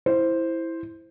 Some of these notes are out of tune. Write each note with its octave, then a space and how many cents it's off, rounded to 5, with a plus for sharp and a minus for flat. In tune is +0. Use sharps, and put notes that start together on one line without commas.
E4 +0 C5 +0